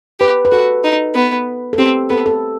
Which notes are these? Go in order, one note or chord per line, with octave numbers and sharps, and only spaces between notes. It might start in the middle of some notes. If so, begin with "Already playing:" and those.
G4 B4
B4
F#4 A4
D#4
B3
A4
C4 G4
B3 A4
A4